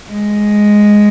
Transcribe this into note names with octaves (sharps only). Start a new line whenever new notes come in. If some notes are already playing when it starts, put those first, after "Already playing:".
G#3